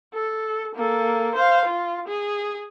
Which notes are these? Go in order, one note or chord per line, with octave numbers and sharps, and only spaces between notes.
A4
A#3 A4
C5 F5
F4
G#4